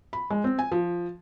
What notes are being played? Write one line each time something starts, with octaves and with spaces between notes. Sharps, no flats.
B5
G#3
C4
G#5
F3